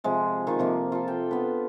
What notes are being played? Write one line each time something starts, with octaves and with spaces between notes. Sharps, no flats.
C3 F3 G#3 G5
D#3 F4 C#6
C3 F3 A#3
F4 A4
G4 G5
B3 D4 B4